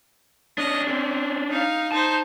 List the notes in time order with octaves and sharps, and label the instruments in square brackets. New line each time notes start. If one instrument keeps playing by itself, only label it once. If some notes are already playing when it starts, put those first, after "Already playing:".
[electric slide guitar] C#4 D4 [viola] D#5
[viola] C4
D#4 F5
[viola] D#4 C5 [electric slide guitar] A5